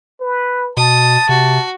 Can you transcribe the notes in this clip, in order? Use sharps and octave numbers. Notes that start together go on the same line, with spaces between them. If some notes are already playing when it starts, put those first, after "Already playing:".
B4
B2 A5 D#6
C3 F#4